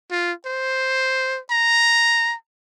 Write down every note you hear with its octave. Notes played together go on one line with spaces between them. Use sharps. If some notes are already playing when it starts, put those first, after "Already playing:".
F4
C5
A#5